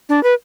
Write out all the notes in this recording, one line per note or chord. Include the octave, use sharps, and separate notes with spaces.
D4
B4